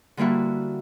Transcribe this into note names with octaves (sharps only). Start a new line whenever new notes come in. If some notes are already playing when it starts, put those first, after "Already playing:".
D3 G3 A#3 E4 F#4